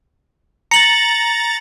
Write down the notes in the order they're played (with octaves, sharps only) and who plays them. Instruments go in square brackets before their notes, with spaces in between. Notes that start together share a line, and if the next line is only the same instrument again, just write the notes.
[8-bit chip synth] A#5 A6 [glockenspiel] C#7 F#7